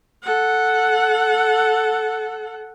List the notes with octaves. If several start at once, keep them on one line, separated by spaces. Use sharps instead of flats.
A4 F#5